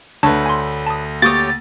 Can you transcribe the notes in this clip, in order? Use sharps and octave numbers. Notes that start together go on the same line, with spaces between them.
D2 A3 D4 B4 C#5 A5
G#5 C6
A5 D#6
A#3 G4 C#5 C#6 D#6 A6